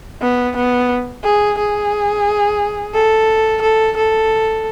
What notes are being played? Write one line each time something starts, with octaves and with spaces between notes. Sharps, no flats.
B3
B3
G#4
G#4
A4
A4
A4